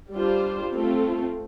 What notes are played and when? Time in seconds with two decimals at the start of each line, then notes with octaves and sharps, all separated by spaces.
0.14 G3 D4 F4 C5
0.74 A3 C4 F4 A4